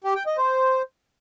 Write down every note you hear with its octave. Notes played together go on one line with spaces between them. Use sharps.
G4
G5
D#5
C5